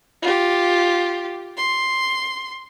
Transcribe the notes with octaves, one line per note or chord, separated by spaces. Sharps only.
F4 G4
C6